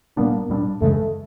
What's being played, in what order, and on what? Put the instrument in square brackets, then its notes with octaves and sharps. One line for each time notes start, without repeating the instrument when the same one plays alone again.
[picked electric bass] A#2 G3 B3 D4 [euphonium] A#3
[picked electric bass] A#2 G3 B3 D4
[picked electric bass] F#2 C#3 E3 G#3 [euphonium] A3